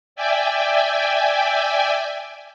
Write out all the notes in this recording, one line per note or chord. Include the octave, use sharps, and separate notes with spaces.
D5 E5 G5 G#5